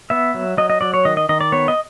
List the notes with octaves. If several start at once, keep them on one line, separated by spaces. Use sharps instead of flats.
B3 E5
F#3
F#3 D#5
D#5
F#3 D5
C#5
D#3 D#5
D#5
D#3 D#5
D5
B3 C#5
D#5